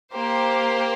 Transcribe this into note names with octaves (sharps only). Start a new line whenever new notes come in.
A#3 G4 C5